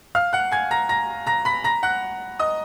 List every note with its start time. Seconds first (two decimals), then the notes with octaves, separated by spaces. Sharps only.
0.15 F5 F6
0.33 F#5 F#6
0.52 G#5 G#6
0.71 A#5 A#6
0.89 A#5 A#6
1.27 A#5 A#6
1.45 B5 B6
1.64 A#5 A#6
1.83 F#5 F#6
2.40 D#5 D#6